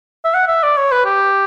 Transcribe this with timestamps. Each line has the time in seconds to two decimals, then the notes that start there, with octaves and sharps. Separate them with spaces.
0.25 E5
0.34 F#5
0.47 E5
0.63 D5
0.77 C#5
0.92 B4
1.05 G4